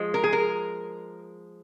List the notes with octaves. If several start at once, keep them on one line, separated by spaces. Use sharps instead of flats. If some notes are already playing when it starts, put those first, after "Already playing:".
Already playing: F3 G#3
A#4
G#4
A#4